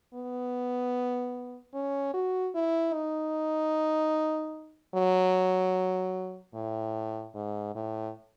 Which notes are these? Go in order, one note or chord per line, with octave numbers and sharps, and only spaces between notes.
B3
C#4
F#4
E4
D#4
F#3
A2
G#2
A2